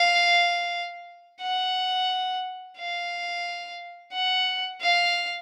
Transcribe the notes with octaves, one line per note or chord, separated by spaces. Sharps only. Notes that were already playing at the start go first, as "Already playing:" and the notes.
Already playing: F5
F#5
F5
F#5
F5